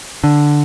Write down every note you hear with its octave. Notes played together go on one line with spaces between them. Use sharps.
D3